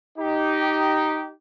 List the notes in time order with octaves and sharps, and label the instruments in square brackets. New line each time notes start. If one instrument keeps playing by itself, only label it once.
[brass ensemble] D#4 G4